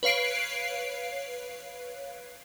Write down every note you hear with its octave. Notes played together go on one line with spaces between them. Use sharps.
B4 C#5 F5 C7 D7